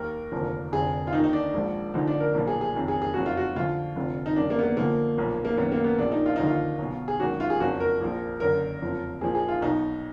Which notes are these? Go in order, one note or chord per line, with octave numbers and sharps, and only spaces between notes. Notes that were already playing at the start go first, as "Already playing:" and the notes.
Already playing: D#2 D#3 A#4
F1 D#2 D3 F3
F1 F2 D3 G#4
F4
D#2 D#3 D#4
D#4
D4
A#1 G#2 F3
D2 D3 F3 D#4
D4
A#4
B1 A#2 F3
G#4
G#4
F#1 F2 D#3
G#4
G#4
F#1 F2 F3 F#4
F4
F#4
D2 D3 F3 F4
F1 F2 D3 F3
D#4
F#1 F#2 D#3 D4
A#3
B3
A#3
D2 D3 F3 A#3
B1 A#2 F3
A#3
F#1 F#2 D#3 B3
A#3
B3
A#1 A#2 F3 D4
D#4
F4
D#2 D3 F3 D#4
F4
B1 B2
G#4
G#1 F#2 D#3 F#4
F4
G#4
F#1 F2 F3 F#4
A#4
A#1 A#2 F3
F#1 F#2 D3 A#4
F#1 F2 F3
A#1 A#2 F3 G#4
G#4
F4
B1 B2 D#4